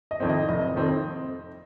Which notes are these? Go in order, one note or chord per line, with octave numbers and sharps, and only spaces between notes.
D#5
F2 D#3 C4
D#5
F1 D#5
F2 D#3 C4